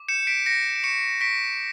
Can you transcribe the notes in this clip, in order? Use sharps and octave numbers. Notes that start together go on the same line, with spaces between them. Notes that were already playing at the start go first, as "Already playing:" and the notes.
Already playing: D6
G6 C#7 E7
C#7
B6 D7
G6 A#6 C#7
D7
C#6 C#7 E7
C#6 B6 D7